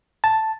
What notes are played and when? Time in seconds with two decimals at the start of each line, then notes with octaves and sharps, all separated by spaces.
0.24 A5